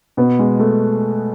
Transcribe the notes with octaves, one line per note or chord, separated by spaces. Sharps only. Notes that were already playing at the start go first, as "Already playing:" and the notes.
B2 B3
G#3
A3